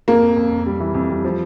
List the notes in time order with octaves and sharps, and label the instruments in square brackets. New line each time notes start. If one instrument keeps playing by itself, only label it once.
[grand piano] F2 [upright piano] A#3
[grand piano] F2
F2
F2
G3
E3
F2
G3
F3